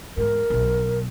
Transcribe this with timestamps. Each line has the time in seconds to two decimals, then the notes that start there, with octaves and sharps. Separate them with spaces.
0.17 E2 G#2 A#4
0.50 B1 B2